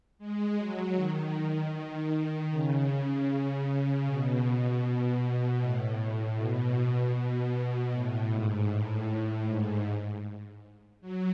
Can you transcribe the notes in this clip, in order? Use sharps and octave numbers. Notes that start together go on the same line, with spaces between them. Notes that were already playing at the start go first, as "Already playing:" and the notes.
G#3
F#3
D#3
D#3
C#3
B2
A2
B2
B2
A2
G#2
A2
G#2
F#3